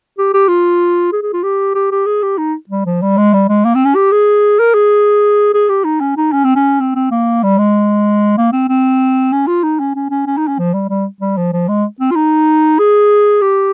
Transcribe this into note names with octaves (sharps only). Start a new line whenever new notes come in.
G4
G4
F4
G#4
G#4
F4
G4
G4
G4
G#4
G4
D#4
G3
F3
G3
G#3
G3
G#3
A#3
C4
C#4
G4
G#4
A#4
G#4
G#4
G4
D#4
C#4
D#4
C#4
C4
C#4
C4
C4
A#3
G3
G#3
A#3
C4
C4
C#4
F4
D#4
C#4
C#4
C#4
C#4
D#4
C#4
F3
G3
G3
G3
F3
F3
G#3
C4
F4
D#4
G#4
G4